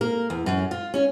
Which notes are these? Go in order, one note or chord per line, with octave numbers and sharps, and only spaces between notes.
A#3 A#4
E2
F#2
F4
C#4 C#5